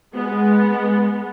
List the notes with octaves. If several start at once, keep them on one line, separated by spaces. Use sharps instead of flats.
G#3 B3